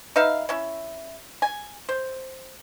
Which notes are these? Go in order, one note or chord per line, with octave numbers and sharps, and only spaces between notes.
D#4 B4 E5 F5
C#4 E4
G#5
C5